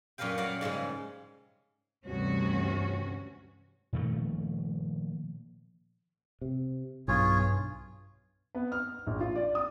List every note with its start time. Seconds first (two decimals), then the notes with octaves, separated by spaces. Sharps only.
0.18 F#2 A#2 A#4 B4 F5 G5
0.37 F#3 G3 A#4 D5 F5 F#5
0.61 G#2 C#3 G3 G#3
2.06 D2 G2 C3 E3 C#4 F#4
3.93 A#2 D#3 F3 A3
6.42 C3
7.08 B1 G2 F4 G#4 C#5
8.55 B3
8.72 F6
9.07 A#1
9.20 F4
9.36 D5
9.55 D#6